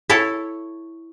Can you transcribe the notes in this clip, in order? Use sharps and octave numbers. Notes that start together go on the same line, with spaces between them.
E4 A4 C#5